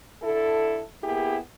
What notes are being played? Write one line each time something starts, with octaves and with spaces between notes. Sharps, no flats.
D3 E4 A4
A#3 B3 E4 G4 G#4